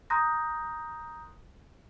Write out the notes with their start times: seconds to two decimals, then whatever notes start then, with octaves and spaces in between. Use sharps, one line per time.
0.10 A#5 C6 D#6 F#6 G6 A#6